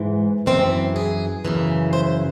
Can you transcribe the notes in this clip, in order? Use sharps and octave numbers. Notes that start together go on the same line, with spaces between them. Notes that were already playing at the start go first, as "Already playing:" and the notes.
Already playing: G#2 E3
F#2 E3 C4
G#4
F#2 C#3 E3
C5